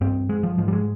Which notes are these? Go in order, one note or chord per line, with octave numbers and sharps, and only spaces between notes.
G2 C4
G#3
F3
G#2 F3
G3
G#3